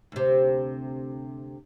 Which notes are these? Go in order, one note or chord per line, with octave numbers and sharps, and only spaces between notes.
D2 C3